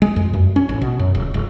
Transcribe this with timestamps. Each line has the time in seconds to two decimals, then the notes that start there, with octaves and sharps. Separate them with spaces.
0.02 G#3
0.16 F2
0.33 F#2
0.56 C#4
0.69 A1
0.82 B2
0.99 F#2
1.15 D1
1.34 D#1